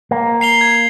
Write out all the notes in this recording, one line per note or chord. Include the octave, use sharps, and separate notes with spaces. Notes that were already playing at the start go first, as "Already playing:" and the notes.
A#3
C7 F7 G7
G#6